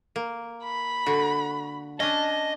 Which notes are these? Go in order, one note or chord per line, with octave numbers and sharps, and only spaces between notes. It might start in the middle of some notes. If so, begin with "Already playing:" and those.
A#3
B5
D3 F#4
C#4 D4 D#5 A5